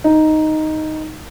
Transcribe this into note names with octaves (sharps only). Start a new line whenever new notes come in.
D#4